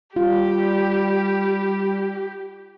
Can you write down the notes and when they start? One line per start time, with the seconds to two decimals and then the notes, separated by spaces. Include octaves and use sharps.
0.16 G3 F4 G4